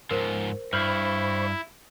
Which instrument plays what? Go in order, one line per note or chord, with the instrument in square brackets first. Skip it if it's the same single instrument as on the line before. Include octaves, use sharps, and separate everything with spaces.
[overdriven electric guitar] G#2 F3 [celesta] A#4 C5
[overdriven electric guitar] G2 [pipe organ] E4 [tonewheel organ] C5 B5 C#6 [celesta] F6